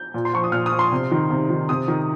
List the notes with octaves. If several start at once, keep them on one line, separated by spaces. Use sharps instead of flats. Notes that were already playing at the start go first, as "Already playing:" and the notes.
Already playing: G6
A#2
C6
F3 C#6
D#6
A#2 F6
D#6
F3
C6
C3
D#3
C3
D#3
C3 D#6
D#3